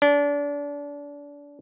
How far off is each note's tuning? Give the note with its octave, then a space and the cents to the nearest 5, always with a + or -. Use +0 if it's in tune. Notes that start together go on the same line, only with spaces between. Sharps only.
D4 -30